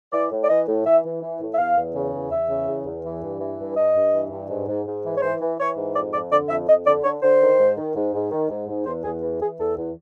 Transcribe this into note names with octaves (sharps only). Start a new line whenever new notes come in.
E3 D5
A2
D5
E3 D#5
A2
E3 E5
E3
E3
A2
E5
E2 F5
E2
C#3
E2
E2 E5
C#3
E2
E2
E3
G2
E3
G2
G2 D#5
G2
E3
G2
G#2
G#2
G#2
E3
C#5
E3 C5
E3
E3 C#5
G#2
F2 D5
F2 D5
D3 D5
F2 E5
F2 D#5
D3 D5
D3 C#5
D3 C5
D#3
G#2
D#3
G#2
G#2
D#3
G#2
G#2
E2 C5
E2 G#4
E3
E3 G#4
E2 A4
E2